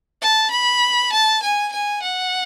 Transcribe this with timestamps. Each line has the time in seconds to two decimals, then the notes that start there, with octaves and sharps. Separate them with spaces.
0.22 A5
0.51 B5
1.13 A5
1.43 G#5
1.73 G#5
2.03 F#5